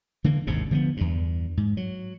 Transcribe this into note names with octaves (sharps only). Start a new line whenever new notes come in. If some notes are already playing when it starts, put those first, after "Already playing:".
D3 E3 A#3
G#1 D#2 G#2 C3
D3 F3 A#3 B3
E2 G2
G#2
F#3